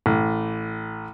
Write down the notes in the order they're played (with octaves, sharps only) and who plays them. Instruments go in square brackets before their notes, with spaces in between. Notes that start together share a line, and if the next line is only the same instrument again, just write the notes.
[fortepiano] A1